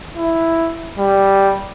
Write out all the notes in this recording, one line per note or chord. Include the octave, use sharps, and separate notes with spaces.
E4
G3